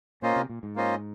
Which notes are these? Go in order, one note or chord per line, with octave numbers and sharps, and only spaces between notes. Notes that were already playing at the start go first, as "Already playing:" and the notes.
A#2 A#3 C#4 F4 C5 D#5
C3
A#2
G#2
A#3 C#4 F4 C5 D#5